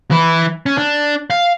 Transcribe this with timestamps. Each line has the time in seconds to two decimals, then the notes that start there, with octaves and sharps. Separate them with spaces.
0.11 E3 E4
0.66 C#4
0.78 D4
1.30 F5